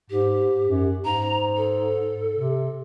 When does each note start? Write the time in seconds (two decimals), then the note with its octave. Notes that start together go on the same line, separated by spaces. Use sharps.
0.10 G#2 G4
0.66 F#2
1.05 G#2 A#5
1.57 A4
2.37 C3